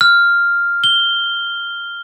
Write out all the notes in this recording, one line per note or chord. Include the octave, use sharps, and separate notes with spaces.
F6
G7